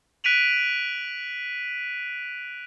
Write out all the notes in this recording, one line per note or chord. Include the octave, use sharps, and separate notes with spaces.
F#6 B6 D7 D#7 F7 F#7